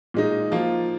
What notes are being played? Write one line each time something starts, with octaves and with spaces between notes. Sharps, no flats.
A#2 G#3 D#4
F3 A#3 F4